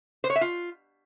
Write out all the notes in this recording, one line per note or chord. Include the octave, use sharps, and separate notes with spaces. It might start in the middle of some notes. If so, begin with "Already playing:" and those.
C5
C#5
E5
F4